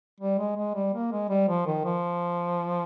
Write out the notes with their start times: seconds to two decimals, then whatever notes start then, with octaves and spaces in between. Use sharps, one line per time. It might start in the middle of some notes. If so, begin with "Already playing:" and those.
0.20 G3
0.39 G#3
0.56 G#3
0.75 G3
0.94 A#3
1.12 G#3
1.29 G3
1.48 F3
1.66 D#3
1.85 F3